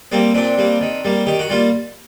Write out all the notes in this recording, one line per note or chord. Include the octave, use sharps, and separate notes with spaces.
G3 A#3 C4
A#2 C4 D4
G3 A#3
D#3
G3 A#3
D#3 G4
F#4
G3 A#3 F4